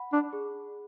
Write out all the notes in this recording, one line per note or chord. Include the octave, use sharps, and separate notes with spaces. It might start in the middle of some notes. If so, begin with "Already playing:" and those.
Already playing: F#5 B5
D4
G#4